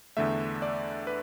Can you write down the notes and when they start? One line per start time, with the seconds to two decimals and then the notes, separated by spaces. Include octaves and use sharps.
0.17 E2 D3 A3 E5
0.62 D5
1.07 B4